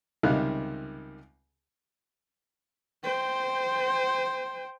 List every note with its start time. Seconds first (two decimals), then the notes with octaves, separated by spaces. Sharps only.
0.23 C#2 C3 D#3 G3 F5 F#6
3.04 C5 G5